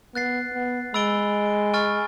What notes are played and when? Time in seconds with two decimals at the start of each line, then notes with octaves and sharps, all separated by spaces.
0.14 B3 F#6 A6 C7
0.54 B3
0.94 G#3 B5 E6 A6 D7 G7
1.74 G#5 C#6 F6 A6